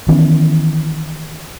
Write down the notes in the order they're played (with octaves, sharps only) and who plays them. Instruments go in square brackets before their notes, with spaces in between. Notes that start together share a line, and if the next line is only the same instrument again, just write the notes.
[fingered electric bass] D#3 E3 B3 C#4